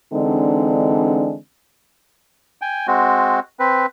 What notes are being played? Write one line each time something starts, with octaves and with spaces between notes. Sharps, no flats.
D3 E3 G#3 C4 D4 D#4
G5 G#5
G#3 C4 F#4
C4 B4